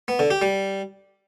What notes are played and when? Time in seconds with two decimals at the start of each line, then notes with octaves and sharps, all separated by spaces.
0.08 B3
0.19 D3
0.30 G4
0.42 G3